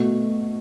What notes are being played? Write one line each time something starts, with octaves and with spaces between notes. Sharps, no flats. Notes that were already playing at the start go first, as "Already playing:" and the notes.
Already playing: B2 A3 F#4